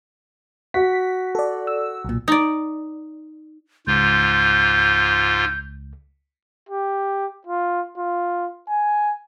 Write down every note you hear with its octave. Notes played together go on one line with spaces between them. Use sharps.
F#4 B6
A4 D5
E6
B1 A#2
D#4 D5
C#2 G#2 F4 G6
G4
F4
F4
G#5